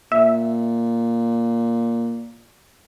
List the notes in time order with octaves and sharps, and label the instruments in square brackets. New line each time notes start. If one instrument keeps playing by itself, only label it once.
[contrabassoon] A#2 [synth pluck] E5